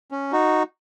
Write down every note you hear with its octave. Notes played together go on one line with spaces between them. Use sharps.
C#4
D#4 F#4